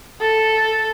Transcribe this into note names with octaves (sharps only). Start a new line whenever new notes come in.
A4